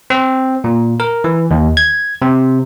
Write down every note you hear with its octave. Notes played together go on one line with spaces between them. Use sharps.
C4
A#2
A#4
E3
D#2
G#6
C3